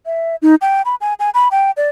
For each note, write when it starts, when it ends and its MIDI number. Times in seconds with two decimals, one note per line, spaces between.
0.06 0.36 76
0.42 0.55 63
0.61 0.82 79
0.86 0.95 83
1.01 1.14 80
1.20 1.30 80
1.34 1.49 83
1.51 1.71 79
1.77 1.90 74